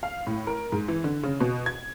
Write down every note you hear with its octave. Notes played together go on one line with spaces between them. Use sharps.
F5
A2
A#4
G#2
E3
D3
C#3
B2
G#6